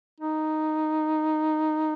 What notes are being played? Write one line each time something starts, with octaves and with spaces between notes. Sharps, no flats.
D#4